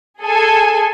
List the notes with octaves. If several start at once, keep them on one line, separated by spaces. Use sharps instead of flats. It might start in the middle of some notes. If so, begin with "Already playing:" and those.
G#4 A4 G#5